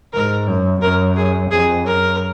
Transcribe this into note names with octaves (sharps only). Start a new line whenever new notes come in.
G#2 A#4
F#2
F#2 A#4
G#4
F2 G#4
F#2 A#4